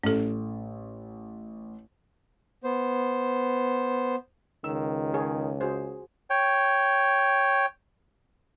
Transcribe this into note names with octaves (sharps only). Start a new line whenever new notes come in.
A1 C#4 A4
B3 C5
C#2 D#3 E6
G#4 C#5
F#4 G#4 C5
C#5 G5